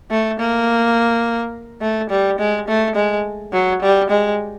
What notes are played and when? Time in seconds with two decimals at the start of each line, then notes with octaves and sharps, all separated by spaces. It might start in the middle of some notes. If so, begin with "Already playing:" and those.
0.11 A3
0.39 A#3
1.81 A3
2.10 G3
2.39 G#3
2.68 A3
2.95 G#3
3.53 F#3
3.82 G3
4.10 G#3